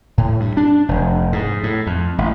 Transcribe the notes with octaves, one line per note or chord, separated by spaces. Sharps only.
A2
G2
D4
F1
G#2
A2
F2
A1